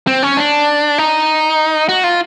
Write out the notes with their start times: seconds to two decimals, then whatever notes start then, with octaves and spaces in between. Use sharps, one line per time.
0.07 C4
0.23 C#4
0.37 D4
0.98 D#4
1.89 F#4
2.04 F4